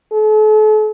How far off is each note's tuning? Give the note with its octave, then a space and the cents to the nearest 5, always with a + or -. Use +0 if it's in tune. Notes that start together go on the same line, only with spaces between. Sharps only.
A4 -40